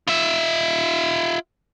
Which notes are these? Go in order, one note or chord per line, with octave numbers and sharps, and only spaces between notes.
F4 E5